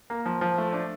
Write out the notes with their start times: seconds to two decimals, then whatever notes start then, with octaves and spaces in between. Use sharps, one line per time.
0.10 A#3
0.26 F3
0.41 F3
0.58 A3
0.73 D4